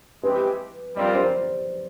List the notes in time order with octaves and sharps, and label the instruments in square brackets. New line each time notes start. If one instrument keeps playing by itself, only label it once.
[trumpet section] G#3 C4 E4 G4 [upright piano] B4
[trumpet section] G3 C4 F4 A#4 [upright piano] D5
[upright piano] C5